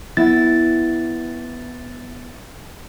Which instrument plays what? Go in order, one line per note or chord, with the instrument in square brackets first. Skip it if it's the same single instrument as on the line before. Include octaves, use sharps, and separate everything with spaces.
[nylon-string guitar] B3 E4 [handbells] A6